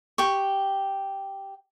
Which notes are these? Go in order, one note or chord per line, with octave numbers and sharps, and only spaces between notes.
G4 G5 C#6